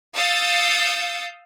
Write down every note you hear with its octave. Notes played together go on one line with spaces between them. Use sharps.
F5 D#6 E6 G6 A6 C#7